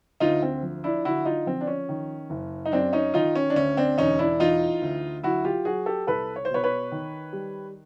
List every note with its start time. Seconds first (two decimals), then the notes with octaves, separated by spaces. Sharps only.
0.20 D2 D#4 F4
0.42 C4
0.62 F3
0.84 D4 E4
1.05 D3 E4 F#4
1.25 D#4 F4
1.46 F3 C4
1.61 D4
1.67 C#4
1.89 D#3
2.30 F#1
2.66 D#4
2.72 F#2 C4 D4
2.93 C#4 D#4
3.14 D#3 D#4 F4
3.35 C#4
3.50 D4
3.56 D2 C#4
3.77 C4 D4
3.98 E1 C#4 D#4
4.19 D4 E4
4.40 E3 D#4 F4
4.82 D2
5.24 F#3 E4 F#4
5.45 F4 G4
5.65 F#3 F#4 G#4
5.86 G4 A4
6.07 C2 A4 B4
6.36 C#5
6.45 C5
6.50 B2 B4 C#5
6.64 B4 C#5
6.92 D#3
7.33 G3